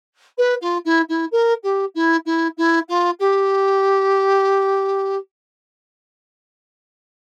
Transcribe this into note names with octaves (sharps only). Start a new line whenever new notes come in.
B4
F4
E4
E4
A#4
G4
E4
E4
E4
F4
G4